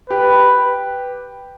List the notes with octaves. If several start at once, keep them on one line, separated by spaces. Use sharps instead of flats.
G4 B4